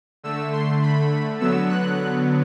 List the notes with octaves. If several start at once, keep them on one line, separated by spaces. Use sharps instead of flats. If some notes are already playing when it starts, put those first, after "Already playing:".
D3 A3 E6
C6
B5
D3 F#3 B3 E6
F#6